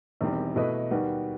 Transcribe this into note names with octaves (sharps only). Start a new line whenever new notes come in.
E1 E2 D#3 G3 C4
B2 A3 E4 B4 D#5
D#2 D#3 G3 B3 F#4